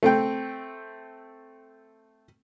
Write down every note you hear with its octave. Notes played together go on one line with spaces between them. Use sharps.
A3 C4 G5